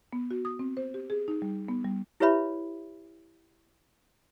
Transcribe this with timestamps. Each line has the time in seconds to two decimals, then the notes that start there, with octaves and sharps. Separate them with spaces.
0.13 B3
0.31 F#4
0.45 D#6
0.59 C4
0.77 C5
0.94 G4
1.10 G#4
1.28 D#4
1.42 G3
1.68 B3
1.84 G3
2.20 E4 G4 B4 C#5 E5 B5